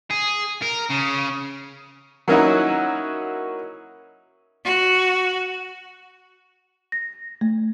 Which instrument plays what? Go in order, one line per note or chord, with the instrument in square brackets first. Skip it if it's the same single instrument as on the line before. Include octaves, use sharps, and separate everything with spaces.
[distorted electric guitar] G#4
A#4
C#3
[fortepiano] F#3 A#3 C#4 D#4 E4 F#4
[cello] F#4
[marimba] A#6
A3